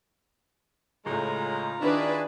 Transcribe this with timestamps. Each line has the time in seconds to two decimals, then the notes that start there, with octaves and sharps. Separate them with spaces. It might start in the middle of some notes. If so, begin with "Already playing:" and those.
1.06 C#2 A2 G#3 C#4 F4 A#5
1.81 D#3 D4 E4 F#4 G#4 B4 D5